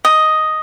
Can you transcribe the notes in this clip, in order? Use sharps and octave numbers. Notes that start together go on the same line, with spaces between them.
D#5